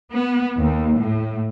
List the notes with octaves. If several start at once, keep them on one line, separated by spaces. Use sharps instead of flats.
B3
D#2
A2